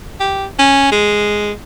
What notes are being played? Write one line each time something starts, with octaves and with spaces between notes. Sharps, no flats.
G4
C#4
G#3